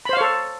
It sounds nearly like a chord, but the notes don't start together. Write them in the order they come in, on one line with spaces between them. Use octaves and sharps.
B5 C5 F5 C#5 A4